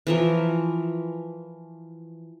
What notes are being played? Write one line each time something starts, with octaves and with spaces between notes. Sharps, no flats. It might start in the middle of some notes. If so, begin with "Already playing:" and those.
E3 F3 A#4